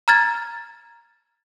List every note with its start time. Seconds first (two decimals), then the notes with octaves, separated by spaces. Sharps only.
0.08 A#5 F6 G#6 A6